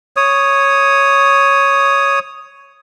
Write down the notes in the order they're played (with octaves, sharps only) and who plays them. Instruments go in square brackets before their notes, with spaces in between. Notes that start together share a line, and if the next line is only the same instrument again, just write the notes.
[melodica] C#5 D#6